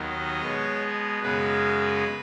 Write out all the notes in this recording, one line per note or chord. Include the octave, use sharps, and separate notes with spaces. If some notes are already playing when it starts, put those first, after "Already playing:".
Already playing: D#2 D#3 F#3 B3 D#5
B2 G#3 B3 C#5
F#2 C#3 G#3 B3 B4